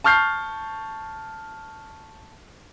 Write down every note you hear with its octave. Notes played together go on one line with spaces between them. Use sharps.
A5 C#6 F6 G6 C7